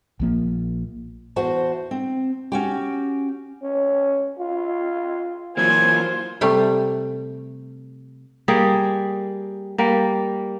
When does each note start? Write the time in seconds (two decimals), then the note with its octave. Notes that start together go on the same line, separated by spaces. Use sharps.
0.20 A#1 F3 A#3
1.36 E2 F#4 C5 A5
1.91 C4
2.52 C#4 F#4 G4
3.63 C#4
4.39 F4
5.57 E3 F#3 A#3 F4 C5 G#5
6.41 C3 G3 A3
8.48 G3 A#3 G#4
9.78 G3 A#3